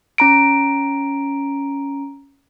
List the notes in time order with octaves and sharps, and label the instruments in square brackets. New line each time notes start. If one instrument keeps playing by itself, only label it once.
[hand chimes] C#4 A#5 D7